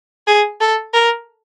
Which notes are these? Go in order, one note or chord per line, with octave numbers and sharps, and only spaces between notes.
G#4
A4
A#4